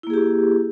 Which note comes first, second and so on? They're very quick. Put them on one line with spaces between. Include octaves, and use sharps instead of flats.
E4 A#3 G#4 G4